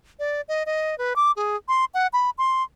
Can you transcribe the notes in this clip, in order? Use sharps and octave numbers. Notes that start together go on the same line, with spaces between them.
D5
D#5
D#5
B4
D6
G#4
C6
F#5
B5
C6